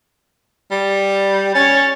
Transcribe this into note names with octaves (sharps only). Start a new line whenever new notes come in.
G3
C#4 C#5 A6